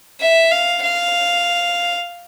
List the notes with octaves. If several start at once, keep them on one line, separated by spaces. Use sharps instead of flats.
E5
F5
F5